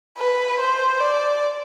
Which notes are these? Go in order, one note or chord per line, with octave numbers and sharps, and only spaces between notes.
B4
C5
D5